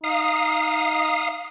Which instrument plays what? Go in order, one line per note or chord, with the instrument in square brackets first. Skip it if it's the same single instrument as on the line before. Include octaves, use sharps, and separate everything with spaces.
[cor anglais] D#4 [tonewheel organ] F5 D#6